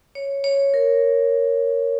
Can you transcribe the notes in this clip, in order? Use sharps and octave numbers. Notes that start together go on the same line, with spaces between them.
C#5
C#5
A#4